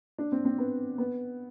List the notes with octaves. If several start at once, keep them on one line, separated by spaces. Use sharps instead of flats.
D4
C4
C4
B3
B3